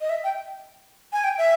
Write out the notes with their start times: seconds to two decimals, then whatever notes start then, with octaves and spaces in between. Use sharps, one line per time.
0.01 D#5
0.10 E5
0.24 G5
1.13 G#5
1.24 G5
1.38 E5